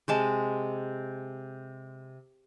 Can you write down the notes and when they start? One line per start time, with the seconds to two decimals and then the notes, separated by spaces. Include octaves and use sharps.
0.08 C3 G#3 A5